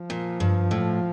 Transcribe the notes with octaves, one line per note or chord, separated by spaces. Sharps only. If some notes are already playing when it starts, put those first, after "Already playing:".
Already playing: F3
A#2
G2
A2